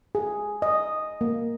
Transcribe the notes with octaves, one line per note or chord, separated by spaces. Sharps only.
G#4
D#5
A#3